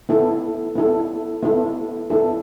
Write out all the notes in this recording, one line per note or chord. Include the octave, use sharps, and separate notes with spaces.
B3 E4 A4
B3 E4 A4
B3 E4 A4
B3 E4 A4